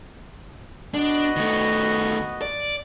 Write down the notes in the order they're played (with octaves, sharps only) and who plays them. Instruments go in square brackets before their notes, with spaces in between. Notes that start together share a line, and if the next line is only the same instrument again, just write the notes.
[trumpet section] B3 F#4 D#5 [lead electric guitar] D4
[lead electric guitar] D#3 A3
D5